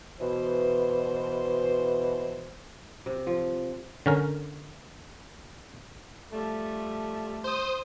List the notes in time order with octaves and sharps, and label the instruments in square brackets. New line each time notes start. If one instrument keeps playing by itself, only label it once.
[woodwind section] B2 E3 [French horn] C5
[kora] C3
F3
[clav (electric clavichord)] D3 C#4 A#4
[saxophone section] F3 G3 A3
[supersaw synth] C5 D#6